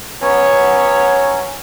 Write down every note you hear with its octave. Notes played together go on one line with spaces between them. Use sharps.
F#3 B3 C#4 C#5